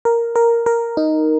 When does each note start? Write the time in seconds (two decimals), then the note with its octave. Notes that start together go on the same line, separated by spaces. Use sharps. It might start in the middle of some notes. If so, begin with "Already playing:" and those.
0.05 A#4
0.36 A#4
0.66 A#4
0.97 D#4